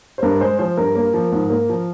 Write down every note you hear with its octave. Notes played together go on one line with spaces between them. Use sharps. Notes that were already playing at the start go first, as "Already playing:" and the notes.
C5
G2 A#4
G#3 C5
F3 C5
G2 A#4
A#3
F3
G#2
A#3
F3